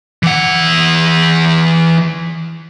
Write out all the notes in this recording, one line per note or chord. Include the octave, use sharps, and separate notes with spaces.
E3 F#5